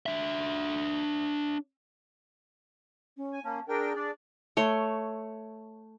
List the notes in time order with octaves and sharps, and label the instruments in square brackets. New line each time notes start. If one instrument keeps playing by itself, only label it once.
[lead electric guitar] D4 E5
[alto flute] C#4
[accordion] G#5
[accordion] A#3 C#4 [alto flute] A5
[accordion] D4 A#4 G5 [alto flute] G#4
[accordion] D4 D5
[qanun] A3 C#5 C6